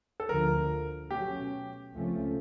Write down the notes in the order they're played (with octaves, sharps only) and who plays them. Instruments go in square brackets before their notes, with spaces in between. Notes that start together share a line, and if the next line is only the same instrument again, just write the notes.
[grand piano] A4
[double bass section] D2 D3 F3 [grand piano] A#4
[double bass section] B2 F#3 A3 C#4 [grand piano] G4
[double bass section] C#2 C3 F3 A3 C#4